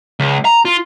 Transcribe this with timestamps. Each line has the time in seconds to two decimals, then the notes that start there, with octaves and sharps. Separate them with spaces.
0.20 C#2
0.45 A#5
0.65 F4